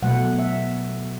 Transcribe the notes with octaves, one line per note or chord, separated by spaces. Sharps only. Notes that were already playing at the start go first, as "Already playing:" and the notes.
B2 F#3 A3 F#5
E5